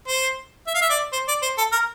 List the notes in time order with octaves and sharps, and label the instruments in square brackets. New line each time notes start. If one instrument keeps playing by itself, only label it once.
[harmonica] C5
E5
F5
E5
D5
C5
D5
C5
A4
A#4